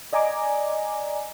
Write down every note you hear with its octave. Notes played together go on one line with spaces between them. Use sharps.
D5 D#5 G#5 A#5 D6